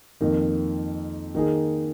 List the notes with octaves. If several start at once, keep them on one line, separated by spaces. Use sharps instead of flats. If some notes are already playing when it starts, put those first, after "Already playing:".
F2 D#3 A#3 D#4
D#3 A#3 D#4 G#4